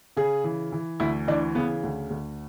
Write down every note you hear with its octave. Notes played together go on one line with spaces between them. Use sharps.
C#3 G#4
E3
E3
D2 E4
E3 D4
C#3 B3
D2
D2